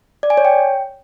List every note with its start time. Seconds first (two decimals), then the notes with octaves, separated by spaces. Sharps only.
0.23 D5
0.30 G#5
0.37 C#5
0.45 G5